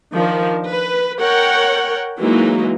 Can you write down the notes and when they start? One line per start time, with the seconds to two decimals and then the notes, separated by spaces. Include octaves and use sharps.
0.14 D#3 F3 D4 A#4
0.67 B4
1.19 A#4 C#5 F#5 G5
2.21 E3 F#3 G#3 A#3 D#4